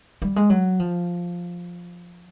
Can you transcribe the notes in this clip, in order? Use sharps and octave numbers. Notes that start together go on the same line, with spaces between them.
G3
G#3
F#3
F3